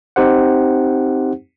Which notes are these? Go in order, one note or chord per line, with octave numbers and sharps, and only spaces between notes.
C4 D#4 G4 C5 F#5